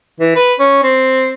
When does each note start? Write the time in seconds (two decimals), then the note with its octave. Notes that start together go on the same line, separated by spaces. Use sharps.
0.20 E3
0.36 B4
0.59 C#4
0.83 C4